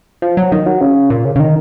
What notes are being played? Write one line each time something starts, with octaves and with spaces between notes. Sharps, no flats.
F3
F#3
D#3
F#3
C#3
A#2
C#3
C#3
D#3